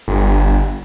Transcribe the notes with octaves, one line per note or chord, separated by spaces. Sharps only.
G1